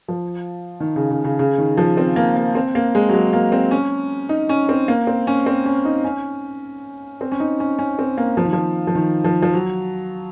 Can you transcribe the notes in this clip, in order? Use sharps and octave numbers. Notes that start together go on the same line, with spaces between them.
F3
D#3
C#3
C#3
C#3
C#3
D#3
F3
C4
A#3
A#3
C4
A#3
G#3
F#3
G#3
A#3
C4
C#4
D#4
C#4
C4
A#3
C4
C#4
C4
C#4
D#4
C#4
C4
C#4
D#4
C#4
C#4
C4
A#3
F3
D#3
F3
F3
D#3
F3
F3
F#3